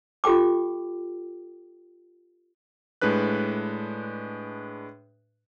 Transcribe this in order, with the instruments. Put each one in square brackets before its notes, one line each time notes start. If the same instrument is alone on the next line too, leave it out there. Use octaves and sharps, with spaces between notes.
[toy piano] F4 G4 A4 G5 D6
[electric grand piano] A2 G#3 D4 B4 F#6